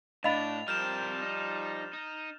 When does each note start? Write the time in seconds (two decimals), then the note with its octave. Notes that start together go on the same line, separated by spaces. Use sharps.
0.24 A2 D4 D#5 F5 B5 A6 F7
0.68 F3 G3 C4 A#4 F6 G6 E7
1.22 D#4
1.94 D#4